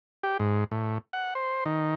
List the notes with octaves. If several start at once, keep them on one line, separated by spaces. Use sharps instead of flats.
G4
G#2
A2
F#5
C5
D#3